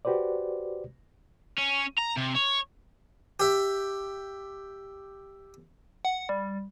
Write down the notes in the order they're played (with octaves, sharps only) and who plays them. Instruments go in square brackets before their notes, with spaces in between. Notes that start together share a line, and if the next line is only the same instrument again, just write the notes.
[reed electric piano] F#4 G4 B4 C5 D5
[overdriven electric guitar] C#4
A#5
C3
C#5
[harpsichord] G4 E5
[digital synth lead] F#5
G3